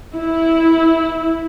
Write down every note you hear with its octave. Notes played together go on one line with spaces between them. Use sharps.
E4